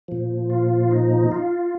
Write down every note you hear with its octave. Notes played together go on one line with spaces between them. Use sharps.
A#2 F3
F4
D#4
F4